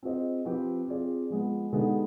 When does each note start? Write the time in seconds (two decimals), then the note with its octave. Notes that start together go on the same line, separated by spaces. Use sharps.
0.03 C4 F4 G#4 C5 D#5
0.45 F3 C4 G4 B4
0.88 C4 F4 G#4 D5
1.30 F3 G#3 B3
1.73 D3 G#3 B3 D#4 G4